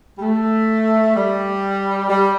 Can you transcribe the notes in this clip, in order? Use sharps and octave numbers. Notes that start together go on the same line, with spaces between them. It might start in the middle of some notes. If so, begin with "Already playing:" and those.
G3
A3
G3
G3